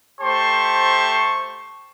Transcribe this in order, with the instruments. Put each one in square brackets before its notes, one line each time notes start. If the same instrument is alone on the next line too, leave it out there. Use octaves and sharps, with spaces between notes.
[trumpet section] A3 G4 C5 A5 C6 C#6